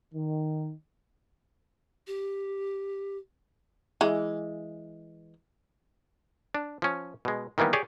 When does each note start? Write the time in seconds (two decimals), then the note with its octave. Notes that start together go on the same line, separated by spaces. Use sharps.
0.14 D#3
2.07 G4
4.01 E3 G#3
6.54 D4
6.82 F3 C#4
7.25 B2 G#3
7.58 D#3 E3 G3 A#3 B3
7.73 G4 G#4 C#5 D5